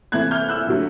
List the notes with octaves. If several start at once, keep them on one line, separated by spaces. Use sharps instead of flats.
C3 E3 A3 F#6 G#6
F6 G6
E6 F#6
D3 F#3 A3